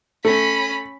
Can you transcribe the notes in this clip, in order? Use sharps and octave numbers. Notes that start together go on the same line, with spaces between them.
A3 C#4 B5